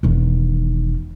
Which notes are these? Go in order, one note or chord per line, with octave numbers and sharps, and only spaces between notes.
E1 D#3